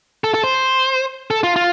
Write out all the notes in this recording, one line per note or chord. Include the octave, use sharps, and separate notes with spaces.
A4
A4
C5
A4
F4
F4